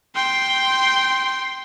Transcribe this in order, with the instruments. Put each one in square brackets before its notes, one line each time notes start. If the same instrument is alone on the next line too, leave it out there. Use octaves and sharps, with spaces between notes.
[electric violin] G5 C6